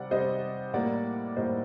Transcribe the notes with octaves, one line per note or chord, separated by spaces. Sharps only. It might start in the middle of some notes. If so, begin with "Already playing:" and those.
Already playing: C3 G3 C4 D5 F#5
C3 G3 C4 C5 D#5
A2 G3 A#3 D5 F#5
A2 G3 A#3 C5 D#5